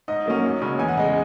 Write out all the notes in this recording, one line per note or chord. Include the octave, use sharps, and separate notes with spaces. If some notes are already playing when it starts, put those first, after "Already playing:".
G#2 D#5
F#3 A#3 C#4
F#2
C#3 G#3 C#4
E2 G#5
F#5
C#3 G#3 D#5
G#4